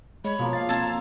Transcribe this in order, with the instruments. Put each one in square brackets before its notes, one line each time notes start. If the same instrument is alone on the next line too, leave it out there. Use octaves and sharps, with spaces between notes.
[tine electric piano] G#3 [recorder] C#5 [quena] B5
[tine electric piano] B2 [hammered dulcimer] F3 A#3
[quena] F5 [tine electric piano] A6
[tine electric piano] C4 G#6 [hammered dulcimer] F4 A4 [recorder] A5
[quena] A#5